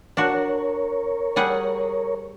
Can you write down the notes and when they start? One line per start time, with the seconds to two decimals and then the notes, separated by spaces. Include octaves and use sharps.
0.17 D4 F#4 A#4 C#5
1.36 G3 G#4 F#5